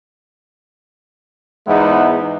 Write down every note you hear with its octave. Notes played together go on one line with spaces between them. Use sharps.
E2 G#2 G#3 B3 D#4 E4